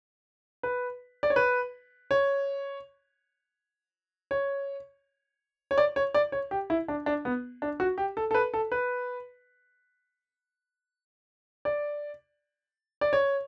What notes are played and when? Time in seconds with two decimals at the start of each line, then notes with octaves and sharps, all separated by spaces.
0.63 B4
1.23 D5
1.30 C#5
1.36 B4
2.11 C#5
4.31 C#5
5.71 C#5
5.78 D5
5.96 C#5
6.14 D5
6.32 C#5
6.51 G4
6.70 E4
6.88 D4
7.06 D4
7.25 B3
7.62 D4
7.80 F#4
7.98 G4
8.17 A4
8.31 A4
8.34 B4
8.54 A4
8.72 B4
11.65 D5
13.01 D5
13.13 C#5